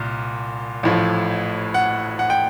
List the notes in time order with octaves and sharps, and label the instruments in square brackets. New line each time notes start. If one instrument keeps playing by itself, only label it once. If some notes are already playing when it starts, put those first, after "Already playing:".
Already playing: [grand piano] C2 A#2
A1 A2 F3
F#5
F#5
G5